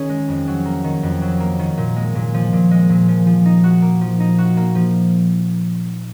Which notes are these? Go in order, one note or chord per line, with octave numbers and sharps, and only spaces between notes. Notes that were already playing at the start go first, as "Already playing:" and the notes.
Already playing: D#3 C#4 G#4
G#3
F2
F#3
A#3
D#3
F2
F#3
A#3
D#3
A#2
G#3
A#2
F3
A#2
G#3
A#2
F3
F3
D#4
F#4
A#3
F3
D#4
F#4
A#3
F3